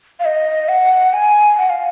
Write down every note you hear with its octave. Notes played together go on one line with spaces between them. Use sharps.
F5
D#5
F#5
G#5
F#5
F5